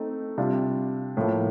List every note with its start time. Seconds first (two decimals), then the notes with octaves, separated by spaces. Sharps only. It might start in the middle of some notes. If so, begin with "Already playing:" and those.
Already playing: A3 C4 D#4
0.38 C3 G3 D4 F4
1.17 A2 F3 A#3